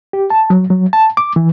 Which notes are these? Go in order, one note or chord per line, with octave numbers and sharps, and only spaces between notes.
G4
A5
F#3
F#3
A5
D6
E3